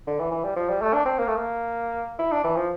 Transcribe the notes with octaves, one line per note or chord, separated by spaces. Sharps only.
D3
E3
E3
G3
F3
G3
A3
D4
C4
A#3
A3
A#3
E4
D4
E3
F3